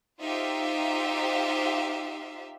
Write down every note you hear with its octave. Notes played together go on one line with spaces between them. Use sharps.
D#4 F4 G4 C5 E5 F5